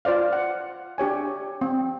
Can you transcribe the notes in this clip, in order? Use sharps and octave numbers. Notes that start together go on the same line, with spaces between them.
F4 C5 D5 F5
F#5
D4 G4 C#5 G#5
C4